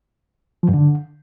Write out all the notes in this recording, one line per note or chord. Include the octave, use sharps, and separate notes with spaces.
F3
G2
D3